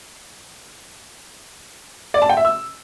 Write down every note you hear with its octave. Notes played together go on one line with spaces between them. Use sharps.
D5
A5
G5
E5
E6